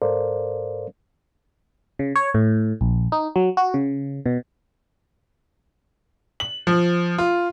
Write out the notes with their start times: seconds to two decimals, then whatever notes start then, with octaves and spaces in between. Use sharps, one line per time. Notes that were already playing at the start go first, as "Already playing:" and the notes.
0.02 G#2 A4 A#4 C5 D5 F5
1.99 C#3
2.16 C#5
2.34 A2
2.81 A#1
3.12 D#4
3.36 F#3
3.57 F#4
3.74 C#3
4.26 B2
6.40 F#7
6.67 F3
7.18 F4